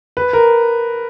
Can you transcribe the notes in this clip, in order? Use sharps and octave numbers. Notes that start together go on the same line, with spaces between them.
B4
A#4